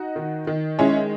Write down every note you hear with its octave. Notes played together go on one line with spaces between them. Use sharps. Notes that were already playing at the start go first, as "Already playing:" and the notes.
Already playing: D#4 F#4
D#3
D#3
G#3 C#4 E4